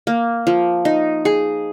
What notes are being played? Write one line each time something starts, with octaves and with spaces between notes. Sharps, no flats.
A#3
F3
D#4
G#4